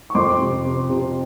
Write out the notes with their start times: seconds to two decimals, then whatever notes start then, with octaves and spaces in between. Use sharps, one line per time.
0.10 C#6
0.15 F2 C6 D6
0.40 C3
0.65 C3
0.90 C3